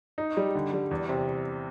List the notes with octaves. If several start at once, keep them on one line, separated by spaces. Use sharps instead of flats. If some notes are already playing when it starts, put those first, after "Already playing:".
D#4
G3
D3
G3
E2
C3